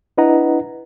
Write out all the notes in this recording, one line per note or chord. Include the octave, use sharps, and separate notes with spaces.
D4 E4 B4 D#5 F#5 A#5